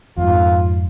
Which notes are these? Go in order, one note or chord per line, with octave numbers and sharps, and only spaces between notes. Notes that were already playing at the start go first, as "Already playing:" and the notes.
F2 G#2 F4